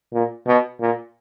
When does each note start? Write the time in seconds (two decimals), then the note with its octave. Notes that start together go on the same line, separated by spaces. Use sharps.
0.13 A#2
0.47 B2
0.80 A#2